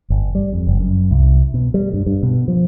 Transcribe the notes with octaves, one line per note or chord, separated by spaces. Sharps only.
G1
G3
F2
F#1
F#2
C2
B2
G3
G2
G2
B2
F3